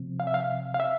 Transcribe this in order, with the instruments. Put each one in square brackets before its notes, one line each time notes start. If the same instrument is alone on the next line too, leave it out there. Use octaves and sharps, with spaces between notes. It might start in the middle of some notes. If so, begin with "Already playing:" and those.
Already playing: [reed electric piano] C3 F3 C4
F5
E5
F5
F5
E5